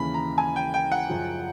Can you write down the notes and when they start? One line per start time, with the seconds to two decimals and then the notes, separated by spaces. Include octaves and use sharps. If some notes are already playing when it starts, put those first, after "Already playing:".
Already playing: D#2 C#3 E3 B5
0.14 A#5
0.38 G#5
0.56 G5
0.74 G5
0.92 F#5
1.09 F#2 C#3 F3